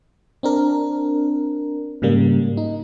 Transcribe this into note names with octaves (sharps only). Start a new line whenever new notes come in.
C4 D4 A#4
G#2 C#3 G3 A#3
D#4